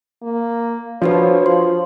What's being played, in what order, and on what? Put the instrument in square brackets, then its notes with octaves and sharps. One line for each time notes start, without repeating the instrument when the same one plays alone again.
[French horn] A#3
[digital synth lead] F3 [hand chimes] D4 F#4 B4 [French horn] C#5
[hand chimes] C6